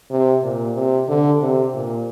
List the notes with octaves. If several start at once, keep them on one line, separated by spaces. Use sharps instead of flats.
C3
A#2
C3
D3
C3
A#2